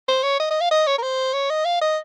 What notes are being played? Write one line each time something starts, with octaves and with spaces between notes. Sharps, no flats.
C5
C#5
D#5
D#5
F5
D#5
C#5
A#4
C5
C#5
D#5
F5
D#5